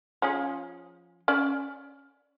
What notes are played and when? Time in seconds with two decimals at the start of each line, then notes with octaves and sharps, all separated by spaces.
0.22 F3 C#4 G#4
1.28 C#4 D5